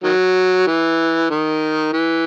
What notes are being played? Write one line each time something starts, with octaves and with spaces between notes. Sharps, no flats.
D#3 F#3
E3
D#3
E3